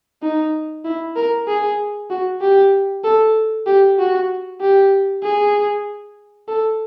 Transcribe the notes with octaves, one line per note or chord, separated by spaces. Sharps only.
D#4
E4
A#4
G#4
F#4
G4
A4
G4
F#4
G4
G#4
A4